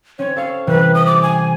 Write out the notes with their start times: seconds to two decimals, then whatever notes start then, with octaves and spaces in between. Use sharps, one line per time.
0.19 C4 C#4 C#5
0.36 A4 F5 C#6
0.67 C3 E3 G3 B4
0.94 D#6
1.06 G4 D6
1.23 G#5